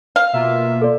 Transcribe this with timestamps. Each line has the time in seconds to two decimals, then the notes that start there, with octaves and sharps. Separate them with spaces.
0.16 F5
0.33 B2 A#3 F4 E5
0.82 A4 D5